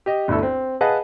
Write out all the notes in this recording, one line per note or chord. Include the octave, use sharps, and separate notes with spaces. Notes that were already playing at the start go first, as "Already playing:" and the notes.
G4 D#5
G1 D2 E4 A4
C4
G#4 B4 D#5 F5 F#5 A5